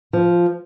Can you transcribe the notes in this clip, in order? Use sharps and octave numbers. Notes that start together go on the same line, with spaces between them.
F3